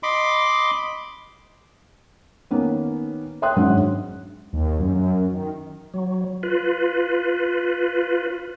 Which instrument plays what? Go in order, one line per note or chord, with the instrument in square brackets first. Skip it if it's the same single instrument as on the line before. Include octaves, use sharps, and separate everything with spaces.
[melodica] D#5 B5 C6 D6
[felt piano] D#3 A#3 B3 C#4
C#5 E5 G5 C6 D#6 F#6
G#1 F#2 G#3 C#4 D4 F#5
[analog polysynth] D#2
F#2
F#2
D#3
[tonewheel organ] F#3
F4 B4